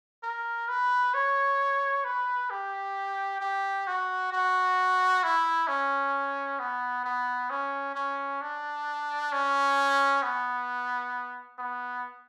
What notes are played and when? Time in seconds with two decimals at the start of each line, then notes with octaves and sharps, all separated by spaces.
0.23 A#4
0.68 B4
1.14 C#5
2.05 B4
2.51 G4
3.41 G4
3.87 F#4
4.33 F#4
5.24 E4
5.68 C#4
6.59 B3
7.05 B3
7.50 C#4
7.96 C#4
8.42 D4
9.32 C#4
10.23 B3
11.59 B3